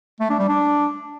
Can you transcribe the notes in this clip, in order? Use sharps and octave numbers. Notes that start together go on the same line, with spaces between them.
A3
D4
G3
D4